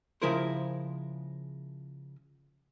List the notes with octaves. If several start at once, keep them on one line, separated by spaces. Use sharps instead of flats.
C#3 F3 G#3 E4 A#4 C5